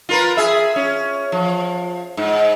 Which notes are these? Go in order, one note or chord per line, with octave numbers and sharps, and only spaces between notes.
F4 A#4 B4
G#4 E5
C#4
F3
G#2